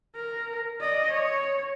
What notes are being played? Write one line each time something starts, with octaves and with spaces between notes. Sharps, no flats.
A#4
D5 D#5
C#5